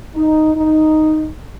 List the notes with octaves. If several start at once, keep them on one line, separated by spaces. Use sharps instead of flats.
D#4
D#4